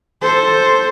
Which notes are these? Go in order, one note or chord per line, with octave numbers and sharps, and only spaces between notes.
A4 C5